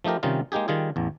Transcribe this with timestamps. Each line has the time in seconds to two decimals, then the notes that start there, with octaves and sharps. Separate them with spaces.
0.04 F3 A3 D#4 G4 A#4
0.23 C3 D#3 G3 C#4 D#4 F4
0.52 G#3 A#3 D#4 G4 G#4
0.68 D#3 G3 F4 G#4
0.96 A1 E2